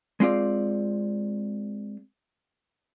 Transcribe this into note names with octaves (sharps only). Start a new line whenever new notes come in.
G#3 C4 F4 D5